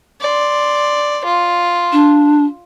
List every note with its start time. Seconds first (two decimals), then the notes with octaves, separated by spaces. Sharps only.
0.21 D5 C6
1.25 F4
1.92 D4